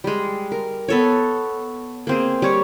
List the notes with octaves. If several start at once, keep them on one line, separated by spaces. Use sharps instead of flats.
G3 G#3
A#4
B3 A4 C#5
A#3 C4 G#4
G3 C#5